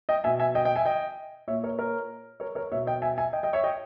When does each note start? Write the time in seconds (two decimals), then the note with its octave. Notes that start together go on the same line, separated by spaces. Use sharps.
0.09 D#5 G5
0.24 B2 E5 G#5
0.40 E5 G#5
0.55 D#5 G5
0.65 D#5 G5
0.76 E5 G#5
0.86 D#5 G5
1.48 A#2 C#5 E5
1.64 A#4 C#5
1.79 A#4 C#5
2.40 A#4 C#5
2.55 A#4 C#5
2.72 B2 C#5 E5
2.87 D#5 G5
3.02 E5 G#5
3.17 E5 G#5
3.33 D#5 G5
3.43 D#5 G5
3.53 C#5 E5
3.64 D#5 G5